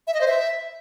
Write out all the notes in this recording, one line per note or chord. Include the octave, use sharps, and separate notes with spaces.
E5
D#5
C5
E5